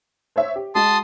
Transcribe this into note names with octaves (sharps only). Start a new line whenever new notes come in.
C5 C#5 E5
G4
G#3 F#4 A5 C6 D#6